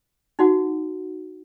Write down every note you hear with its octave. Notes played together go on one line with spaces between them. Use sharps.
D#4 F#4 F#5